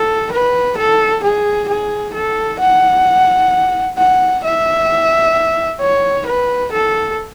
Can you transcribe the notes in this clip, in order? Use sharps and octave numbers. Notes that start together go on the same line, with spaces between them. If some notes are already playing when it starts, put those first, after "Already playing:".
Already playing: A4
B4
A4
G#4
G#4
A4
F#5
F#5
E5
C#5
B4
A4